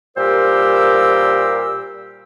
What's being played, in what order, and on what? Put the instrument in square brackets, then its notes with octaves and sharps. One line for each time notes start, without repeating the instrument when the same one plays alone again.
[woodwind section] A#2 G3 G4 A#4 C5 E6